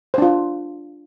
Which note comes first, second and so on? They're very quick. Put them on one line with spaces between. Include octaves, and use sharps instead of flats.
C5 D4 F4